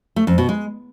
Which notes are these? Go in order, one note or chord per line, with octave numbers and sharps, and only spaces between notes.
A3
F2
B2
G#3